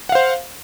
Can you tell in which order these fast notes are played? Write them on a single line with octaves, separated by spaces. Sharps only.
F#5 F5 C5